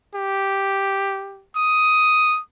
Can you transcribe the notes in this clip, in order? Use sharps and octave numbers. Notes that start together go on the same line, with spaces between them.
G4
D#6